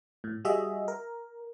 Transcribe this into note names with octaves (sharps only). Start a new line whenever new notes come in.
A2
G3 F#4 G#4 D#5 E5
A#4